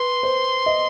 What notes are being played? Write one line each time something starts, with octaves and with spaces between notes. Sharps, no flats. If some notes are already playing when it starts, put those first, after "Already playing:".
Already playing: B4 C6
C5
D#5